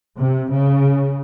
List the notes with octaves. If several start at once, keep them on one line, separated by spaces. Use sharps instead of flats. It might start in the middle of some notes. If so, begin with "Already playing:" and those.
C3
C#3